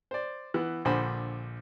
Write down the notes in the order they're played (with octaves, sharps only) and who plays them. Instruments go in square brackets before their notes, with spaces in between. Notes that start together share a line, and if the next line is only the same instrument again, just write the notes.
[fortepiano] C5 D5
E3 B3
A#1 D3 C5 G#5 B5